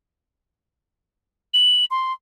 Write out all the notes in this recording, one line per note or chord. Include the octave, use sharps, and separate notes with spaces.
F#7
C6